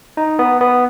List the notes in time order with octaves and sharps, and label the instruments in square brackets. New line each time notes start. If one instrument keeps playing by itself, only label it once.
[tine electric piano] D#4
B3
B3